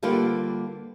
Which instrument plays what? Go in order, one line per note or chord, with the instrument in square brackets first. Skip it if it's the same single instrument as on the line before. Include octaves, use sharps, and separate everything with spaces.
[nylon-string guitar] D3 G3 A#3 F4 A4 B4